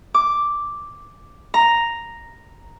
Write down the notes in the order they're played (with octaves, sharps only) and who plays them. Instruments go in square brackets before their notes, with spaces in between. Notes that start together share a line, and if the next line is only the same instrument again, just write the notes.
[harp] D6
A#5